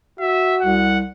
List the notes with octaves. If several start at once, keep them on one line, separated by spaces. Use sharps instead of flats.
F#4 E5
C2 F#5